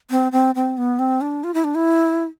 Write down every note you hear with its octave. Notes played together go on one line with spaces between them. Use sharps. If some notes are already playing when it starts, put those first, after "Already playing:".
C4
C4
C4
B3
C4
D4
F4
E4
D4
E4